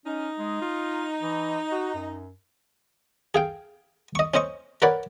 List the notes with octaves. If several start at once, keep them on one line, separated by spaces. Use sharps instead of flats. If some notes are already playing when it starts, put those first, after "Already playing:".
C#4 D#4
G#3
F4
E3
F#4
F#2
G#4 F5 G5
D#5 C#6
C#4 C5 D#5 C#6
A#4 B4 C#5 D5 F#5